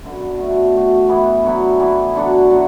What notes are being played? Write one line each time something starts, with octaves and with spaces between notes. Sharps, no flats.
F#2 D3 B3
B2 A3 F#4
A2 A3 F#4
E3 B3 E4
D3 F#3 B3 E4
E3 B3 E4
D3 F#3 D4 F#4
A2 F#3 D4 F#4